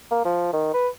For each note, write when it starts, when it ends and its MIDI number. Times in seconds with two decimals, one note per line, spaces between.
0.11 0.23 58
0.25 0.48 53
0.53 0.71 51
0.74 0.88 71